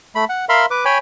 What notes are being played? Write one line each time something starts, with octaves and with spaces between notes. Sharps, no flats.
A3 B5
F#5
A#4 E5 F5 B5 C6
B4 D6
C#5 G5 G#5 B5